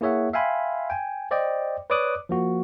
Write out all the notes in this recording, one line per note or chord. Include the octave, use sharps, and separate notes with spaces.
A#3 E4 G#4 C#5 E5 F#5
E5 F5 G5 G#5 B5 C6
G5 G#5
C5 D5 D#5 G5
B4 C#5 D5 D6 D#6 F#6
F3 A#3 F#4